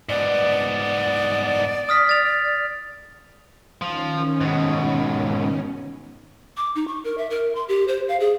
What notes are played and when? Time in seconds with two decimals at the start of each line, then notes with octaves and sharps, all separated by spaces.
0.09 G#2 B3 D5
1.89 D#6 F6 B6
2.09 A6 F7
3.82 D#3 F3 C#4
4.41 G#2 B2
6.57 D6
6.75 D#4
6.88 C#6
7.04 A#4
7.18 E5
7.30 A#4
7.55 C6
7.69 G4
7.88 C5
8.08 F5
8.20 G#4